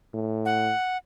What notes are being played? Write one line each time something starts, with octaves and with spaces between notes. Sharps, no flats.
A2
F#5